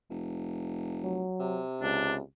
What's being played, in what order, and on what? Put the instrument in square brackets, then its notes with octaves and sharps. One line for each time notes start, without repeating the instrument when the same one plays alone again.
[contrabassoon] F1
[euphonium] F#3
[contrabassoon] C3
[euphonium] C#2 [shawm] D4